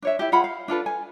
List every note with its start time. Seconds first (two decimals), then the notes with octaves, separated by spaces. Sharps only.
0.02 D4 C#5 E5
0.19 E4 G4
0.32 F4 G#4 F#5 B5
0.44 F5
0.68 D4 F4 A4 B4
0.86 G#5